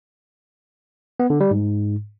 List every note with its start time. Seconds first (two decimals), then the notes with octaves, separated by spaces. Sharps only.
1.20 B3
1.30 D3
1.40 G3
1.51 G#2